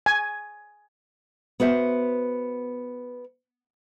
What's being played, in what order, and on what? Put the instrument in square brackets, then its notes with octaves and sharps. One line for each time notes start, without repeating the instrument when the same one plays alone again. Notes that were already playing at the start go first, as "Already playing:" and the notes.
[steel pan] G#5
[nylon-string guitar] B3 F#4 C5 E5